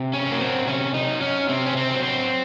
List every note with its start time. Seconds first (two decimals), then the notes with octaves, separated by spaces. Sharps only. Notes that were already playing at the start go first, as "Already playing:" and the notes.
Already playing: C3
0.13 C#4
0.27 F#3 A#3
0.40 C4
0.67 C3 C#4
0.94 D#4
1.09 F#3
1.22 C#4
1.49 C3 C4
1.66 C#4
1.77 C4
1.90 F#3
2.03 C4